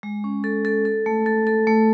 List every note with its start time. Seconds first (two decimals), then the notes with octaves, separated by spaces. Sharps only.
0.03 G#3
0.24 C#4
0.44 A4
0.65 A4
0.85 A4
1.06 A3
1.26 A4
1.47 A4
1.67 A3